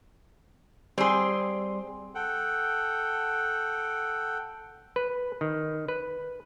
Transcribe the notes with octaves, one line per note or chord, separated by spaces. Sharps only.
G3 C4 G#4 C6
A4 F#5 G5
B4
D#3
B4